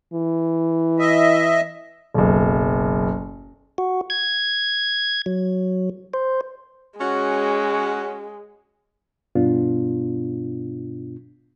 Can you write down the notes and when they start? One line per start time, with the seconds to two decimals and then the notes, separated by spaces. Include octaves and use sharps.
0.13 E3
0.99 D#5 E5
2.14 F#1 B1
3.78 F#4
4.10 G#6
5.26 F#3
6.14 C5
7.00 G#3 C#4 F#4
9.36 G2 B2 B3 D4 F4